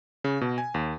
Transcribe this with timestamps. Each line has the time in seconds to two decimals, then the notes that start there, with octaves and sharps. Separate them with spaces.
0.24 C#3
0.41 B2
0.58 G#5
0.74 D#2